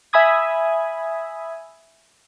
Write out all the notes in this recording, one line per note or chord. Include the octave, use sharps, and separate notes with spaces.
E5 G#5 B5 D#6 G#6